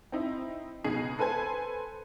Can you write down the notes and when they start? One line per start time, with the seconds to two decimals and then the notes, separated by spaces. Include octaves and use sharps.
0.12 C4 D#4 E4
0.84 C#2 B2 D#4 G#4 C7
1.18 A4 B4 C5 G#5 G#6